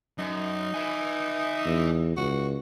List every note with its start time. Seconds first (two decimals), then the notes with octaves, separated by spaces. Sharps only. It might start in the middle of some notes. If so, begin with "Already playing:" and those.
0.19 F#2 D#4
0.74 E5 G#5
1.66 E2
2.17 C#2 F#4